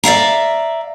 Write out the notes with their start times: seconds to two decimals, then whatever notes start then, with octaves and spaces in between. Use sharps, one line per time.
0.04 D5 E5 F5 A#5